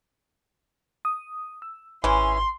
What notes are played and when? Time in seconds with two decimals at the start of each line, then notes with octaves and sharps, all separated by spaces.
1.05 D#6
1.62 E6
2.04 G#1 E3 C#4 C6